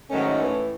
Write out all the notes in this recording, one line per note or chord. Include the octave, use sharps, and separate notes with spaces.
G#2 D#3 F#3 A3 C#4
A2 E3